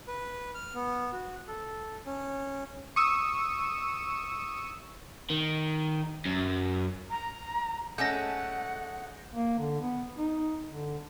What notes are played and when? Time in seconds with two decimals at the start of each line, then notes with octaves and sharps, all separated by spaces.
0.08 B4
0.55 F6
0.74 B3
1.12 F#4
1.48 A4
2.06 C#4
2.96 C#6 D#6 E6
5.30 D#3
6.26 F#2
7.10 A#5
7.98 G#3 A3 C#4 F#5 G6 A#6
9.36 A#3
9.58 D3
9.81 B3
10.18 D#4
10.71 D3